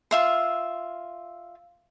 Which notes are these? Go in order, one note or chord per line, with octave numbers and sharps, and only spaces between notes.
F4 E5 C6